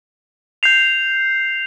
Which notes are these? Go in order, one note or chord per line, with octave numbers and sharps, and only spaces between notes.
G6 C7 F7